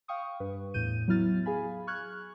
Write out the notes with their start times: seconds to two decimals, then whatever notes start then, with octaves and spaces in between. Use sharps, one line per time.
0.08 F5 G5 C#6 D#6
0.40 G2 B4
0.74 E2 A2 G6 D#7
1.08 F#3 B3 E4 F6 A6
1.46 G#4 F5 G#5 B5
1.87 C#6 F6 F#6 G#6